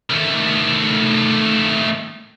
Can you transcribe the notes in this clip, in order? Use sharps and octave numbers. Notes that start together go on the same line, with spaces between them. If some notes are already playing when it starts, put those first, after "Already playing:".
D#3 A3